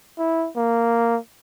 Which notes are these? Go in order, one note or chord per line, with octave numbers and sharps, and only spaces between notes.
E4
A#3